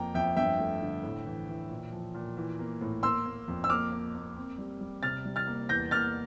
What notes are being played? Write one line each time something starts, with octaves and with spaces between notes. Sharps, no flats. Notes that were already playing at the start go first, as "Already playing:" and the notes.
Already playing: F2 A#3 G5 A#5
F2 E5 G5
G2 E5 G5
A3
D3
A2
E3
E3
A#2
F3
A#2
E3
A#3
A2
A#3 C6 E6
A#3
F2
E6
A#3 D6 F6
A#3
A#3
C4
G3
G3
C3 F6 A6
G3
F6 A6
A#3
E2 G6 A#6
A#3 F6 A6